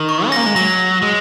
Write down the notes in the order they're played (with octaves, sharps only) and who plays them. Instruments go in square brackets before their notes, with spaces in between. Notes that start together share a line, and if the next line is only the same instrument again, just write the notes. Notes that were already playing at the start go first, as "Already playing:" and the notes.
Already playing: [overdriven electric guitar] D#3
[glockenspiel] C#6
[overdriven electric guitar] C#4
[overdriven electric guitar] A#3 [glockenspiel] A#6
[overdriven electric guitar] G#3
[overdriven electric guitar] F#3 [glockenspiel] A#6
[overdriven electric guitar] G#3